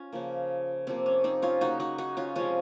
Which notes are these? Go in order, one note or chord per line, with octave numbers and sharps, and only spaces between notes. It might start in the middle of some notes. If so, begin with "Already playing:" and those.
Already playing: C#4 F4
C#3 F3 A#3
C3 F3 A#3 C4
C#4
C4 D#4
C#4 F4
C#3 F#3 A#3 D#4 F#4
D#4 F#4
D#4 F#4
C#4 F4
C3 F3 G#3 C#4 F4